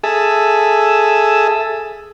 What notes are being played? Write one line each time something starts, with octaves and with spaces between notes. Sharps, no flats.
G#4 A4 E5